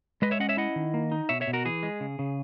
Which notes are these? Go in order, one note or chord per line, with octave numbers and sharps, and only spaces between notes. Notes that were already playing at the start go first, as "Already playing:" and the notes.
G#3 B4 D#5
C#5 E5
C#4 D#5 F#5
C#5 E5
E4 D#5 F#5
D#3
A#3
D#4
B2 C#5 E5
C#5 E5
B2
F#4 A#4
E3 G#4
G#3
C#3
C#3